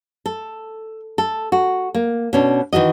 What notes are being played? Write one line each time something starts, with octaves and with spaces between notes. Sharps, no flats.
A4
A4
F#4
A#3
B2 C#4 D4
D#3 E3 F#4 D#5